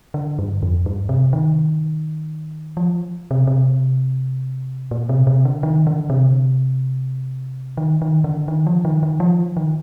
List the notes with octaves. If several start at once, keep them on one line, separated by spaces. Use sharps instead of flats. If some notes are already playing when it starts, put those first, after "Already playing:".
D3
G2
F2
G2
C3
D#3
F3
C3
C3
A#2
C3
C3
D3
D#3
D3
C3
D#3
D#3
D3
D#3
F3
D#3
D#3
F3
D#3